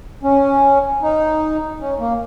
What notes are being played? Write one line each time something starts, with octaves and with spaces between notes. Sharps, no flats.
C#4
D#4
C#4
A#3